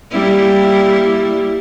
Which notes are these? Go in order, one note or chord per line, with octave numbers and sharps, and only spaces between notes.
G3 A#3 E4